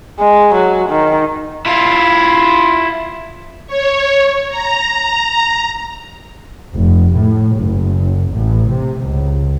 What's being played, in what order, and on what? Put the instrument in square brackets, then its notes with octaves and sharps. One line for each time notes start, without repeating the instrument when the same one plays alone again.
[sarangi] G#3
F#3
D#3
[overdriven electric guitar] E4 F4
[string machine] C#5
A#5
[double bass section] F1
A2
F#1
A1
C3
C#2